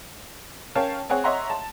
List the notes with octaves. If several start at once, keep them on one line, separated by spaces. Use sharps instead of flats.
C#4 A#4 C#5 F5 G5 A5
C4 G#4 C#5 F#5
C#5 D#5 E5 F#5 A#5 C6
A5